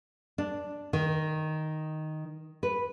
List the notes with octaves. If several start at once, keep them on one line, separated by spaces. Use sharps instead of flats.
D4
D#3
B4